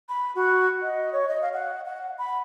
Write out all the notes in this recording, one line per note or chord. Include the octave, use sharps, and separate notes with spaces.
B5
F#4
D#5
C#5
D#5
F5
F#5
F#5
B5